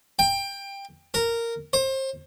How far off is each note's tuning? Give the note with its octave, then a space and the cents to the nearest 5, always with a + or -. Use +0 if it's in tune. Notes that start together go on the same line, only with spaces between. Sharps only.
G5 +20
A#4 -10
C5 +30